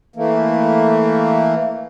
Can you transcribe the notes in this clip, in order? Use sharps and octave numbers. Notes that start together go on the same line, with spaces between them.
E3 A3 A#3